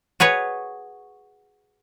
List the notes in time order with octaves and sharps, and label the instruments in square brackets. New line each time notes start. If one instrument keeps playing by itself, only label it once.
[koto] F#4 G#4 B4 C#5